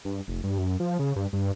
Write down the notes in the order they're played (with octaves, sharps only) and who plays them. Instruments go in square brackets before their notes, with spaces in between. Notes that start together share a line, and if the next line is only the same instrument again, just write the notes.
[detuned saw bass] G2
F1
G2
F#2
F3
C#3
G2
G2